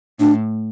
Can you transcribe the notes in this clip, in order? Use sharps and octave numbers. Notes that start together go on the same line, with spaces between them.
A2 D4